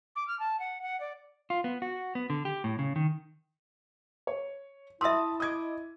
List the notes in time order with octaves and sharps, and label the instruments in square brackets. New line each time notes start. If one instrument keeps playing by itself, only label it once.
[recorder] D6
F6
A5
F#5
F#5
D5
[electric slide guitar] F4
B3
F#4
B3
D3
G4
A2
C#3
D#3
[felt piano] C#5
[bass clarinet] E4 [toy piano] E5 C6 [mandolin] A5 B5 D#6 [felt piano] E6 A6
[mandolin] D#5 D6 [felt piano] D#6 G#6